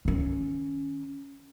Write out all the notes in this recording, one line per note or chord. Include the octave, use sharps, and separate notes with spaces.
D#3 C#4